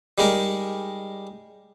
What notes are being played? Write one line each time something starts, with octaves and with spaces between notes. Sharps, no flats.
G3 G#3 D#4 A#4